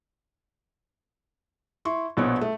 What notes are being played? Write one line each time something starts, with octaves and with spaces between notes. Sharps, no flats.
E4 C6 C#6
A#1 B2 B3 B4 C#5
A3